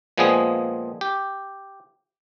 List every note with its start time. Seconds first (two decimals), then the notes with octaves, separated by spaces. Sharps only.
0.17 A#2 F3 G#3 B3 C4 G#4
1.01 G4